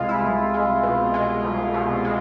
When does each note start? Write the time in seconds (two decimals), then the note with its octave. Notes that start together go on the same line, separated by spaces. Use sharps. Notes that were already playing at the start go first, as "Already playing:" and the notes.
Already playing: C2 G#3 F4
0.09 E4
0.23 C2
0.54 G#3
0.83 B2
1.14 G#3
1.44 C2
1.74 B2
2.05 G#3